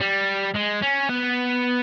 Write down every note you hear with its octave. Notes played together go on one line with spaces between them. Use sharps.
G3
G#3
C#4
B3